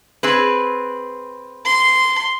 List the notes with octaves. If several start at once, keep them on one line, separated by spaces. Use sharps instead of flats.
C4 G#4 B4
C6